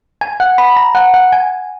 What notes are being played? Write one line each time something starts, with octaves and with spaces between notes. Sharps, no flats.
G#5
F#5
B5
A#5
F#5
F#5
G#5